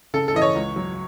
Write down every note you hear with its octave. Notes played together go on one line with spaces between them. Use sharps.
C#3 A4
A4
E3 D#5
C#5
C#2
F#3